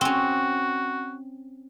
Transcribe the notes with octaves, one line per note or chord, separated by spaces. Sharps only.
C4 C#4 F#4